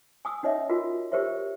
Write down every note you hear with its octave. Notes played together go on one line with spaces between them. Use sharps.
G#5 D#6 E6
C#4 D#4 C#5 D#5 E5
F4 F#4 A#4
G4 A#4 C5 C#5 E5